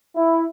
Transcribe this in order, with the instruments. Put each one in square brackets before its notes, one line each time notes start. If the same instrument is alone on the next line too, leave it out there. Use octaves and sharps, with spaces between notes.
[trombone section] E4